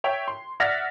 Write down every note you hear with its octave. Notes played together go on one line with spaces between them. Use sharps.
C#5 E5 G5
C6
D5 E5 F#5 F6 A6 A#6